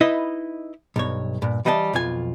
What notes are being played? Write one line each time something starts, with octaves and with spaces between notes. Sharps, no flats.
D#4 E4 B4 D#5
B1 G2 C#5
G2 A#2
E3 G3 D#5 F#5 A5
B1 F2 F4 G#5